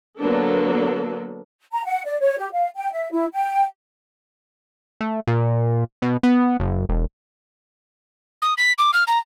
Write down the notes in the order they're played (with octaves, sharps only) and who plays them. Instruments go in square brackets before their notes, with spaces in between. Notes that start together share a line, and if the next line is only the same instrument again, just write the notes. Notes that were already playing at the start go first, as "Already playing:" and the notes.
[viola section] D3 F#3 A#3 B3 D4 A4
[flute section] A#5
F#5
D5
C#5
G4
F5
G5
E5
E4
G5
[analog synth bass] A3
A#2
B2
B3
F#1
E1
[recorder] D#6
B6
D6
F6
A#5